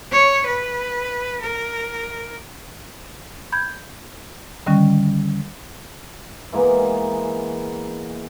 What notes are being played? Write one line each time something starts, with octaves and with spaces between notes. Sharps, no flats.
C#5
B4
A#4
B5 G6 G#6
D3 D#3 G3 C#4
E3 G#3 A#3 B3